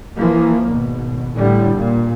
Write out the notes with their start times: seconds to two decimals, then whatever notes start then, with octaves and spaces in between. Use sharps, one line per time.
0.17 E3 F3 A#3
0.66 G#1 B2
1.37 A2 D3 G3
1.75 A#2